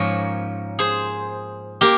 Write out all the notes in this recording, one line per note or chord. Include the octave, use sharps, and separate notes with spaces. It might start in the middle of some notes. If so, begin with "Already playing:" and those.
Already playing: G#2 F3 A#3 C#4 A#4 C#5
G#4 C5
A#3 G4 A#4